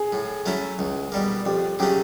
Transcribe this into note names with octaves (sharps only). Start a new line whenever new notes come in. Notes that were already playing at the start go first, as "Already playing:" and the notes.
Already playing: G#4
A2
F#3 A3 C#4 E4
C#2
B2 G3 A#3
F2 G4
C#3 F#3 A3 C#4 G4